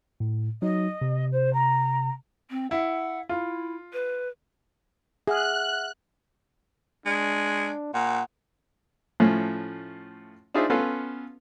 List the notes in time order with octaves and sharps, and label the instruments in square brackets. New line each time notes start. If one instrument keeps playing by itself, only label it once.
[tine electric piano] A2
[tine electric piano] F#3 D#4 [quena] D#5
[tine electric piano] C3
[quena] C5
A#5
[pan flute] C4
[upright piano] E4 [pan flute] F#5
[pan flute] E4 [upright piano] F4
[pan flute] B4
[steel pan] G#4 [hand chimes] E5 F#5 F6 [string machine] F#6
[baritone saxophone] G#3 [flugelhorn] D4
[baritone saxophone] A#2 [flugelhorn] F#5
[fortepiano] A2 F3 A3 C#4
D4 D#4 F4 G#4 C5 E5
B3 C#4 F4 A4 F5